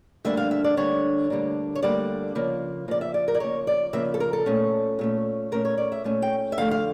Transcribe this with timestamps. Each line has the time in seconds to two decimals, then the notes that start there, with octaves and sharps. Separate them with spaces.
0.24 D2 D3 G3 A#3 D4 E5
0.37 F5
0.51 E5
0.64 D5
0.76 D2 D3 G3 A#3 D4 C#5
1.30 D2 D3 G3 A#3 D4
1.75 C#5
1.82 D2 D3 G3 A#3 D4 D5
2.35 C#3 F3 A#3
2.88 C#3 F3 A#3 D5
3.01 E5
3.14 D5
3.28 A#4
3.35 D5
3.40 C#3 F3 A#3 C#5
3.67 D5
3.93 C#3 F3 A#3 E5
4.14 A4
4.20 A#4
4.33 A4
4.46 A#2 A3 C#4
4.99 A#2 A3 C#4
5.52 A#2 A3 C#4 A#4
5.65 C#5
5.78 D5
5.92 E5
6.04 A#2 A3 C#4
6.22 G5
6.52 E5
6.57 F2 D3 A3 F5
6.71 F5